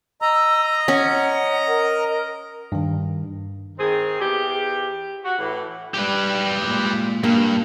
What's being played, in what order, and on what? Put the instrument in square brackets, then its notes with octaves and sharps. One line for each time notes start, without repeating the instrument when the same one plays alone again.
[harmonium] D#5 A#5 [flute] E6
[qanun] C#4 [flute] F#5
[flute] A#4
[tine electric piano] G2 D#3
[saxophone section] D#3 C4 G#4
E2 G4
F#4
A2 E3
[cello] G3 [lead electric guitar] G4 B4
[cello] A#2 G#3
[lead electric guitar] G2 [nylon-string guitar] A#3